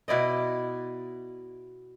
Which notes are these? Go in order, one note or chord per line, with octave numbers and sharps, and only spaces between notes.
B2 E4 D5 D#5